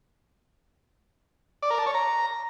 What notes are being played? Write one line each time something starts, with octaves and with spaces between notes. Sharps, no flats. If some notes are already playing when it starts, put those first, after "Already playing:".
D5
A#4
A5
C#5
A#5